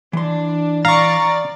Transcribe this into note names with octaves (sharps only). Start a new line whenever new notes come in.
E3 D4 C6
D5 F5 A#5 C#6 A6